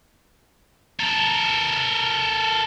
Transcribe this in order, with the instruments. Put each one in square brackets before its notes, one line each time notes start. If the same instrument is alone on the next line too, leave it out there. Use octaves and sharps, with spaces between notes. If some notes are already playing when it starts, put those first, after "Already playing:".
[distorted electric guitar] A4 A#4